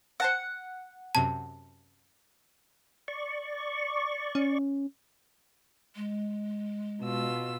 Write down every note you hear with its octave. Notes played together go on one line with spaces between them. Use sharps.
C5 F#5 A5 A#6
F#2 C3 A5 G#6
D5 C#6
C#4
G#3
B2 F4 E6